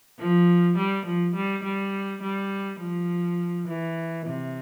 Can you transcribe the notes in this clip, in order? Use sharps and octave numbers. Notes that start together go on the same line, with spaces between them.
F3
G3
F3
G3
G3
G3
F3
E3
C3